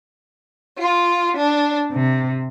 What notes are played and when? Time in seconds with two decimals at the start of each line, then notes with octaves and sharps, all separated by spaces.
0.78 F4
1.36 D4
1.91 C3